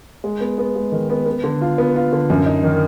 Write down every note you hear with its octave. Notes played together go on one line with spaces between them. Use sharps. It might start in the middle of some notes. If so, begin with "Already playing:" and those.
G#3
B3
B3
G#3
D#3
B3
B3
D3
F4
B3
F4
D3
F#2
D#4
D#3